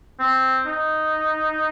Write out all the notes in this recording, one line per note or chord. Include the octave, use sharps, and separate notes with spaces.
C4
D#4